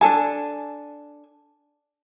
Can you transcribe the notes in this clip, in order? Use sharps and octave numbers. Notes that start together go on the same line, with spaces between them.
D4 G#4 A4 G#5